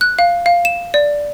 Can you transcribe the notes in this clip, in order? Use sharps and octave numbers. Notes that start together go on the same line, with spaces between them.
F#6
F5
F5
E7
D5